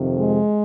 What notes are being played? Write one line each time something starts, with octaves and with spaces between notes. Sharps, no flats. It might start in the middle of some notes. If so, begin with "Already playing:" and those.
Already playing: F2 C3 D#3
G#3